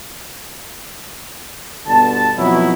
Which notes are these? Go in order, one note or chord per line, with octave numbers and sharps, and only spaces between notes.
G1 B2 D3 A5
F2 B2 F#3 E4